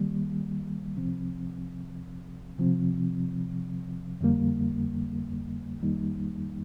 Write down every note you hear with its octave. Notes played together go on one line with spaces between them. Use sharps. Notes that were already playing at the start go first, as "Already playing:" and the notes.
Already playing: D#3 G3 A#3
C2 C3 F3 C4
C3 F3 C4
F2 D3 G3 A#3
F2 D#3 G3 A#3 D#4